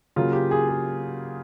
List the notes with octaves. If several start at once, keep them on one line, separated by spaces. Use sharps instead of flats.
C#3 F#3 A#3 F4
G4
G#4
G#4